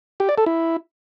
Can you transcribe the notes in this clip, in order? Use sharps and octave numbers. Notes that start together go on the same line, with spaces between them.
G4
D5
A4
E4